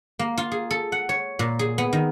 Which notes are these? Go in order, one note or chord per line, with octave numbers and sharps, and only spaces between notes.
A#3
F4
G#4
A4
F#5
C#5
A#2
G#4
B3
D#3